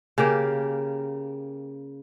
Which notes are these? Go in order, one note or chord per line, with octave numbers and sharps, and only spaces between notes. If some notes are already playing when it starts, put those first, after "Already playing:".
C#3 A#3 G4 A#4